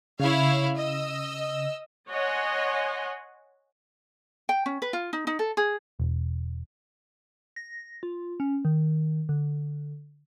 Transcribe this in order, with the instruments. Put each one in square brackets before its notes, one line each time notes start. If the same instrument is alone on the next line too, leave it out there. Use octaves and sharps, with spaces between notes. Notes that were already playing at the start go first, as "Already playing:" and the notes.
[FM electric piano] C#3 [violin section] E4 C#5 F5
[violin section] D#5 E6
[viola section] C#5 D#5 F#5 G#5 C6
[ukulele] G5
C#4
B4
F4
D#4
D#4
A4
G#4
[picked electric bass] E1
[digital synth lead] A#6
F4
C#4
D#3
D3